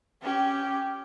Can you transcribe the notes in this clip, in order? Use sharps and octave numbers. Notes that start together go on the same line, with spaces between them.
C#4 G4